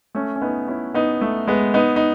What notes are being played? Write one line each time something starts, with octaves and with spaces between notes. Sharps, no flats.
A3 C#4
C#4
B3 D#4
C#4 E4
B3 D#4
A3
G#3 B3
B3 D#4
D#4